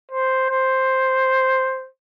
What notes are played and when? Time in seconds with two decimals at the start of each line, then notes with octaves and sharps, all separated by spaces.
0.11 C5
0.50 C5